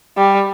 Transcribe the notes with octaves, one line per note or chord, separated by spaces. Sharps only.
G3